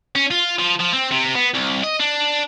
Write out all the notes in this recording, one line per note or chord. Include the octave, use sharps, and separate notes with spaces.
C#4
F4
F3
F3
C4
C3
B3
C2
D#5
D4